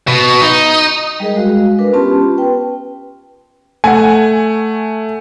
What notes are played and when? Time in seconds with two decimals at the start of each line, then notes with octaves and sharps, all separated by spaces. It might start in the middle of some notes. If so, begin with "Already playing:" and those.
0.07 B2
0.42 D#4
1.20 G3 G#3 G#4 A#4 D#5
1.36 G#3 F#4 F5
1.79 D4 A#4 B4
1.93 B3 C#4 F4 G4 A5 C6
2.38 B4 G5
3.84 A3 F#5 G#5